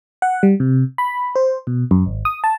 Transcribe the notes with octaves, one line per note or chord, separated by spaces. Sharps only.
F#5
G3
C3
B5
C5
B2
F#2
G#1
D#6
A5